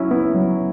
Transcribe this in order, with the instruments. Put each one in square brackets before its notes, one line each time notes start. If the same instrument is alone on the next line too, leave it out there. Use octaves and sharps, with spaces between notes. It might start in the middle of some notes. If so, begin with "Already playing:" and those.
Already playing: [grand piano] F#3 C#4 E4
[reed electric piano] B3 [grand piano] E4
[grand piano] F#3